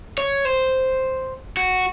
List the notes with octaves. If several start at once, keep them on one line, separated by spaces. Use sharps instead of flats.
C#5
C5
F#4